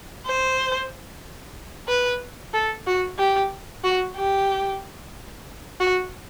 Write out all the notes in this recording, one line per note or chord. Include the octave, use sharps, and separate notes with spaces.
C5
B4
A4
F#4
G4
F#4
G4
F#4